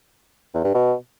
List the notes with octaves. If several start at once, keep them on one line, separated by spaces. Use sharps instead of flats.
E2
G2
B2